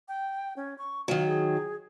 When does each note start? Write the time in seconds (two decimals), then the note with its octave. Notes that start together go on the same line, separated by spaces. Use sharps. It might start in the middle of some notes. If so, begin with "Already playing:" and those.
0.08 G5
0.57 C#4
0.78 C#6
1.08 D#3 F#3 F5
1.27 G#4